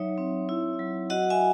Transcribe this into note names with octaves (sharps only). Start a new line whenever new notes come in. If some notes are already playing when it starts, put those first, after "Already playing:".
Already playing: F#3 D#4 C#5 E5
C4
E4
F#3
F#4 D#5 F#5
E5 G#5